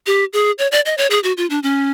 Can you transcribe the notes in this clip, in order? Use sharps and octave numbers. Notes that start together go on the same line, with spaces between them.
G4
G#4
C#5
D5
D#5
C#5
G#4
F#4
F4
D4
C#4